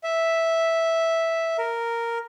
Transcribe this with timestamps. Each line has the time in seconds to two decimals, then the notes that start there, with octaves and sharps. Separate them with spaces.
0.04 E5
1.58 A#4